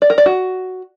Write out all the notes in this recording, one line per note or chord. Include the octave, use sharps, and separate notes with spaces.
D5
A#4
D5
F#4